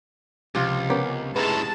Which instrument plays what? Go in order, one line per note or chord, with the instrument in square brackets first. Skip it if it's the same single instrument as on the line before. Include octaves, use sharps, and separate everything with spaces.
[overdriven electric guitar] C#2 [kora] C3 F3 F4
[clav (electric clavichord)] B3 C#4 A#4 [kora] G4
[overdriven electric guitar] F#2 A2 [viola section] G#3 A5 [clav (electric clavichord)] B4 A#5